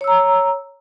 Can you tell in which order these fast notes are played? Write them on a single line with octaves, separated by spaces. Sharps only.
C#5 E6 A#5